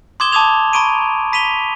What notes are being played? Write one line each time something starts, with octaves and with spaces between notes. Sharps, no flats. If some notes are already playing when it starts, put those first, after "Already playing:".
C6 D6 D#6 G#6 E7 G7
A5 D6 D#6 G#6 F7
A#5 B5 C#6 D7 D#7
B5 B6 D#7 F7 G7